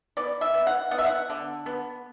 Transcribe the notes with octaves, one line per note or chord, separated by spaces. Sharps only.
B3 D5
E5
B3
F#5
B3 F#5
E5
F#5
D3
B3